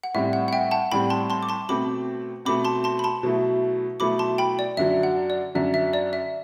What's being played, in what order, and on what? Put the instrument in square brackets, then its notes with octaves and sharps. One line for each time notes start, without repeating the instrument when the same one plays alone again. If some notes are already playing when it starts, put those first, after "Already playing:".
[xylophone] F#5
[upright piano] A2 G3 C4 [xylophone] E5
[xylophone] F#5
F#5
E5 G5
F#5 A5
[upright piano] A2 G3 C4 [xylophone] G5 B5
[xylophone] A5 C6
A5 C6
D6
A5 C6
[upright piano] B2 A3 C4 [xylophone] B5 D6
[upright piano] B2 A3 C4 [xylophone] B5 D6
[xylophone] A5 C6
A5 C6
B5
A5 C6
[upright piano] B2 F#3 A3 E4
[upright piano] B2 F#3 A3 E4 [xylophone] B5 D6
[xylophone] A5 C6
G5 B5
D5
[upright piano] F#2 D3 F#3 [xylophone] E5
[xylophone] F#5
D5
[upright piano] F#2 D3 F#3 [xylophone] E5
[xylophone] E5
D5
E5